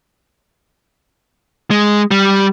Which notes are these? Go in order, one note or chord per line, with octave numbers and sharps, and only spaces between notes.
G#3
G3